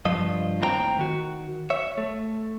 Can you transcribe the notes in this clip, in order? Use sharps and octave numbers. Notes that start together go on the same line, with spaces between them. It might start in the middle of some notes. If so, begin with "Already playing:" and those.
C2 G2 F3 F4 D#5
D#2 A2 C4 A#4 G5 A#5
D#3 F#4
C#5 E5
A3